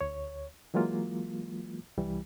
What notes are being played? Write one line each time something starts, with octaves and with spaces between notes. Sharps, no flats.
D2 C#5
E3 F#3 G#3 A#3 F4
C2 E3 G3